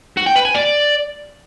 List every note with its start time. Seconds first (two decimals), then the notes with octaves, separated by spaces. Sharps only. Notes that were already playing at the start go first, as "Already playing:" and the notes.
0.17 F#4
0.27 G5
0.36 B4
0.45 G#5
0.55 D5